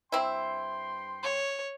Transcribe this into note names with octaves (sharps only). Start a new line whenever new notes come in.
G2 C4 E4 G5 C6
C#5